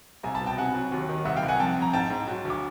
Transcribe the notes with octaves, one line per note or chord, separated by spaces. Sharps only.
C2 G#5 A#5
A5 B5
B2
G5 A5
C3 F#5 G#5
F#3
D#2
D#3
C2 E5 F#5
F5 G5
C2
F#5 G#5
F2 G5 A5
F2
A#5
G#2 G5 A5
G#2
F#3
D2
D6